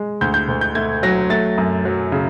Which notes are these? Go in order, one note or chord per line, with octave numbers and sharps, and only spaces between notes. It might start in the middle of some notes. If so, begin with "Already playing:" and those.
Already playing: G#3
D2 G6
G6
D2
G6
A3 G#6
F#3 A#6
A3 A6
F#2
F#3
C#3